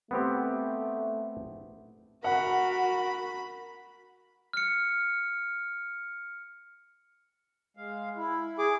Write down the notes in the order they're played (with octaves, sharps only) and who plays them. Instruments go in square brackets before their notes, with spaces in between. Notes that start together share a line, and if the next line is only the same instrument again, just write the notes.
[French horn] A3 [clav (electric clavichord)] B3 C4 G4
[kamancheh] F#4 [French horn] A#4 [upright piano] F#5 [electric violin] B5
[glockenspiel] F6 C#7
[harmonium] G#3 F5
E4
[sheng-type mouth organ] G#4 D6